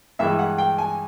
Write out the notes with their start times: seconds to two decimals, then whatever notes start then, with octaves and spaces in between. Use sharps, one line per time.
0.19 G2 E3 G#3 E5
0.39 F#5
0.58 G5
0.78 G#5